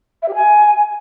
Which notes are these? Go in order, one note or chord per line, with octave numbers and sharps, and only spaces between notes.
E5
G4
G#5